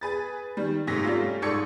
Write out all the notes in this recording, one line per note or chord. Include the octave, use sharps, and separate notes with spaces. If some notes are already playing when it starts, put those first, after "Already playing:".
G#4 B4 A6
D#3 G3
G#2 C3 A3 A#6 B6
G3 A3 C#4 F4
G#2 A4 D5 C#6 G#6 C#7